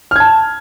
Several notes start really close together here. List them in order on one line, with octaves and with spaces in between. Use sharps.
F6 G#6 A5